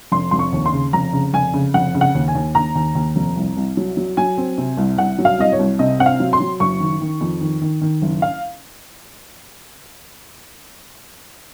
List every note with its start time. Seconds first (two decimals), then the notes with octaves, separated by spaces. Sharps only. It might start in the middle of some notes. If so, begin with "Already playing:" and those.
0.12 F1 C6
0.31 F1 C6
0.39 C#6
0.53 D#2
0.66 C6
0.73 C#3
0.93 F1 A#5
1.13 C#3
1.33 F1 G#5
1.54 C#3
1.74 F1 F#5
1.95 C#3
2.01 F#5
2.15 D#2
2.28 G#5
2.35 D#2
2.55 D#2 A#5
2.75 D#2
2.95 D#2
3.16 F1
3.36 C2
3.57 C2
3.77 F#3
3.97 F#3
4.17 F#3 G#5
4.37 C4
4.58 C3
4.77 C2
4.98 C2 F#5
5.18 F#3
5.25 F5
5.39 C2 D#5
5.52 C#5
5.59 C2
5.79 C3 D#5
5.99 C4 F#5
6.06 F5
6.20 F#3
6.33 C6
6.40 F#3
6.60 F#1 C#6
6.80 D#3
7.01 D#3
7.21 F2
7.41 D#3
7.62 D#3
7.81 D#3
8.02 F#1
8.22 F5